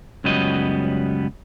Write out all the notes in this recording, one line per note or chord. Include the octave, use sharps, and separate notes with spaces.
C#2 F#2 F#3 G3 B3 D#5